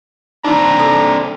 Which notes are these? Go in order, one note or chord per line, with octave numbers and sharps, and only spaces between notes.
C4 D4 D#4 A#5
A4 A5 E6